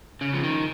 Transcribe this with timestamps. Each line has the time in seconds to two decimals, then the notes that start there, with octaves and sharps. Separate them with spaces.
0.21 C#3
0.33 F3
0.43 D#3